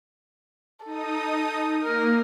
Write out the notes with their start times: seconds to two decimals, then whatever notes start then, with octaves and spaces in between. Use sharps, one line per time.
0.86 D#4 A4 D#6
1.82 A#3 A#4